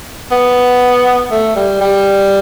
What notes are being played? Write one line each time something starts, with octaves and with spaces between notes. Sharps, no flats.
B3
A3
G3
G3